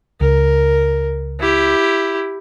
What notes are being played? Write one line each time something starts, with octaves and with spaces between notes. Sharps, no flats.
C#2 A#4
E4 G4